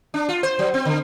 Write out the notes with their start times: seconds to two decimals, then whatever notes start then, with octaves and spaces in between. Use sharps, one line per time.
0.14 D4
0.29 F4
0.43 C5
0.59 F#3
0.74 C4
0.85 D3